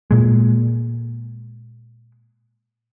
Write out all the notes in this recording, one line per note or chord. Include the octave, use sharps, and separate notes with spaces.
A#2 G#3